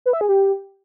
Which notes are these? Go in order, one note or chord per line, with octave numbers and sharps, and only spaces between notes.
B4
E5
G#4
G4